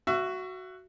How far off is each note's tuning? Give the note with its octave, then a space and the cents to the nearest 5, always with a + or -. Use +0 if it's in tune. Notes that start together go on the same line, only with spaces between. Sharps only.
F#4 +5 E5 +35